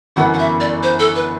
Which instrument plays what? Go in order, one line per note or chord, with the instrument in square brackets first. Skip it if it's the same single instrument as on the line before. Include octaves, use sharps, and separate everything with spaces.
[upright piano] G1 F#2 E3 B3 [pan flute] F#5
[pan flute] F#5
E5
D5
C5
A4
B4